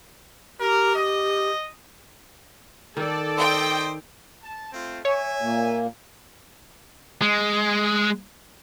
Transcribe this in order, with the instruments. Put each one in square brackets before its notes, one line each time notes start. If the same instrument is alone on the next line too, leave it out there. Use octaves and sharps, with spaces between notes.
[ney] G4 [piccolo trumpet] A#4
[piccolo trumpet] D#5
[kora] D#3 [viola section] A4 D5
[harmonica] C5 D#5 [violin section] G5
[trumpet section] A5
A3 C4 F4
[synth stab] C#5 [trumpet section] E5 G#5
[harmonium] A#2 A#3
[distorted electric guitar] G#3